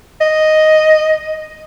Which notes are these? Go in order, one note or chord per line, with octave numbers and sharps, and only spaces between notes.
D#5